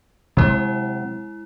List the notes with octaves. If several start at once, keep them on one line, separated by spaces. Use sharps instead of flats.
C3 F#3 G#3 C4 E4